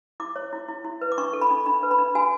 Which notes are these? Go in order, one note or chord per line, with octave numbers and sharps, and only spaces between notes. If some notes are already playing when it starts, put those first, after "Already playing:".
E4 D6
C#5
E4
E4
E4
B4
D6
D4 C#6
A4
B5
D4
D4 B5
B4
B5
D4
F#4 G#5